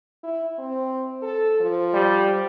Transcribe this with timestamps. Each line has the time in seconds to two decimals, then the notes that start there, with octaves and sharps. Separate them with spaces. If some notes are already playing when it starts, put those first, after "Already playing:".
0.23 E4
0.59 C4
1.22 A4
1.61 F3
1.94 G3